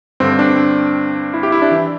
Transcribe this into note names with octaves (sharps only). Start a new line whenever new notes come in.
G2 D3 C4
D4
E4
G4
E4
D4
E3